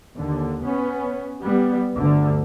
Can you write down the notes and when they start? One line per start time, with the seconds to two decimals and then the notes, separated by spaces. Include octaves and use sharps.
0.18 D#2 D3
0.64 B3 C#4
1.43 G3 B3
1.95 G1 D2 D3